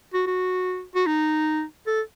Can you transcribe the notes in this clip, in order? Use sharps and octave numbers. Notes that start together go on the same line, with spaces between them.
F#4
F#4
F#4
D#4
A4